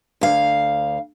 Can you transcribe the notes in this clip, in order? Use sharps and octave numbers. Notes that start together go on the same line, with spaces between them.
D2 F5